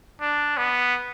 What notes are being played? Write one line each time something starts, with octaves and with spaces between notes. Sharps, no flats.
D4
B3